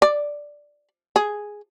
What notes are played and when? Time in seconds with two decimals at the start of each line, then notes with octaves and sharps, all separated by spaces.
0.02 D5
1.16 G#4